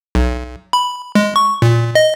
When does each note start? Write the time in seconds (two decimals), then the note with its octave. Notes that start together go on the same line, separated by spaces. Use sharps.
0.15 B1
0.73 B5
1.15 G#3
1.36 C#6
1.62 A#2
1.95 D#5